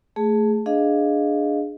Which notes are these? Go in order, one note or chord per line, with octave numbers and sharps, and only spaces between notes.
A3 G#4 A5
D4 G#4 D#5 F5